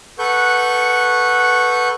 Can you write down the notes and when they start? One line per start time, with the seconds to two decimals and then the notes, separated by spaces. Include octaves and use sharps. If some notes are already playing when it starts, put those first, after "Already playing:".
0.19 A4 B4 F#5 C#6 G6